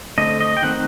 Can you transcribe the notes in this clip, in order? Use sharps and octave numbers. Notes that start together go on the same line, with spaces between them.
D3 A3 C4 D#5
D#5
G5
D#3 A3 C4 F#5